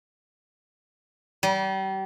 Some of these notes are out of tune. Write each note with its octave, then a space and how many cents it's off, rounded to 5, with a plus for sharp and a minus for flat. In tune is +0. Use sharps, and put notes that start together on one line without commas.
G3 -35